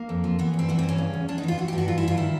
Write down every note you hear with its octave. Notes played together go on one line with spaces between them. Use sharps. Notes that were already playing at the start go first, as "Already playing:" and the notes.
Already playing: A#3
F2
F3
E3 B3
G2
C4
E3 B3
C4
G2 C#4
C#3
E2
E2 D4
D#4
E3 F4
E3 F#4
G4
G2 F#4
E3 F4
E4
G2 F4
D#3 E4